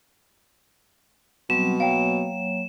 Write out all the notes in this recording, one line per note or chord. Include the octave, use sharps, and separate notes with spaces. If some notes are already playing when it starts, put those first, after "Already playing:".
B2 F#3 G3 C4 E7
F#3 A#3 C#5 F5 G5